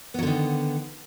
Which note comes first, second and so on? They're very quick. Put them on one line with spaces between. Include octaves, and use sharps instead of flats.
B3 F#3 D3 D#3